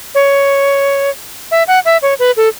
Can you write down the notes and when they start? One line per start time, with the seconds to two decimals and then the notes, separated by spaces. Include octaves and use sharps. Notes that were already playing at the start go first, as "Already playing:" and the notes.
0.15 C#5
1.51 E5
1.68 F#5
1.85 E5
2.02 C#5
2.19 B4
2.37 A4